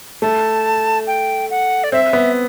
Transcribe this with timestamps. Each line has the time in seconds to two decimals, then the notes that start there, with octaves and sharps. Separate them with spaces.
0.22 A3 A5
1.07 G5
1.51 F#5
1.84 D5
1.92 C4 E5
2.13 B3